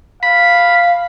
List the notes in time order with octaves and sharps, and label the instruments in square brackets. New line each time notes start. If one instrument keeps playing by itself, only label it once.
[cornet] F5 [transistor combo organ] B5